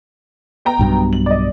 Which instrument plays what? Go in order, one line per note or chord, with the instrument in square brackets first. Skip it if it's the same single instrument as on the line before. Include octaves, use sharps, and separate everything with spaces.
[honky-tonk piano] B3 G5 A#5
[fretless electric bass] B1 G2 B2
[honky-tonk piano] F#7
D5 D#5